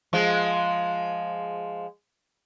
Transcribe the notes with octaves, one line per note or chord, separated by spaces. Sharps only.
F3 G#3